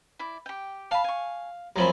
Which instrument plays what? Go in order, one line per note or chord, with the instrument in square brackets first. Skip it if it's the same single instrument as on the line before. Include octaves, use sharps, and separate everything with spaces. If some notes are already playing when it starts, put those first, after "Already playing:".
[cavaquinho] E4 D5
G4 G5
[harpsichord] F5 [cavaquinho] A5 B5
[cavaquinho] G#5 C#6
[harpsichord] F#2 F3 C4 [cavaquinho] A#4 G#5 B5